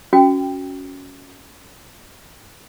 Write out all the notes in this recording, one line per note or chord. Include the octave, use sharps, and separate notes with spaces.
C#4 F#4 G5